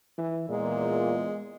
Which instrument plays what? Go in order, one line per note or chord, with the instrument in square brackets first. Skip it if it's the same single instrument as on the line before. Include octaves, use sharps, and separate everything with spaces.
[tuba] E3
[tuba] E2 [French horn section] A#2 [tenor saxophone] G#3